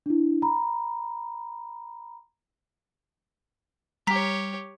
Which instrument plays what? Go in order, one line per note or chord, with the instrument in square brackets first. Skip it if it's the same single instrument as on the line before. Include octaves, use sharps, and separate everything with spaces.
[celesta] D4 E4
A#5 B5
[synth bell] G3 [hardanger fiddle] G4 C#5 [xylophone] A#5 B6